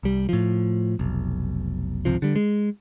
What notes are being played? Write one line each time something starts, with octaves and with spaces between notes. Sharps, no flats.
C2 G3
A2 F3
F1 B1
G#1 C#2 C3 F3
D3 G3
G#3